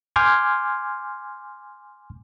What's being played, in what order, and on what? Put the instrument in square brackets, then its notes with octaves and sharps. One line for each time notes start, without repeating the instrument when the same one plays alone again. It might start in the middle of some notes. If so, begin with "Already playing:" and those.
[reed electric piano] G#5 C6 D6 F6 G6 G#6